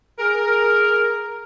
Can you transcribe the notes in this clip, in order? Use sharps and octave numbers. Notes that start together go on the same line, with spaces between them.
G#4 A#4